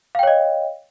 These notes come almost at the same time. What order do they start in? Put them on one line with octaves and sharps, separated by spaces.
F5 G5 C#5 D#5